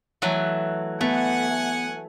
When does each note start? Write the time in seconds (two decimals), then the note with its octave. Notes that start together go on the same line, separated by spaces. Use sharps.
0.22 E3 F#3 A3
1.01 A3 B3 F#5 G#5